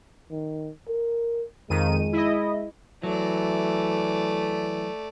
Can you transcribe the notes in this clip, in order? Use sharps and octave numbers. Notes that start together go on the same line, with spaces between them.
D#3
A#4
F2 D#3 G#3 D#7
E4 D#5
E3 F#3 A3 D5